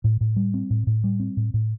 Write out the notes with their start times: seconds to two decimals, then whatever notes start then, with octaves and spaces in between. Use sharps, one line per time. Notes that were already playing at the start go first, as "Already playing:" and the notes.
0.04 A2
0.21 A2
0.36 G3
0.54 C4
0.70 A2
0.87 A2
1.04 G3
1.20 C4
1.37 A2
1.54 A2